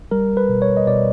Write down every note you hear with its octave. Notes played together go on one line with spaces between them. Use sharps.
G3 A#4
B4
B2
C#5
D#5
B2 D5